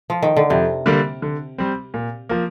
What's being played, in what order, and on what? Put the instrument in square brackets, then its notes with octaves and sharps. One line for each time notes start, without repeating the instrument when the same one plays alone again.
[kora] F3
D#3
D3
[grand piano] F2 [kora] C3
[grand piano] D3 G3 A#3 D4
D3
G3 C4
A#2
F3 A#3